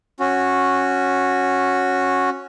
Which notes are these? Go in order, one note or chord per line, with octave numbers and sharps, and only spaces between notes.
C#4 F#4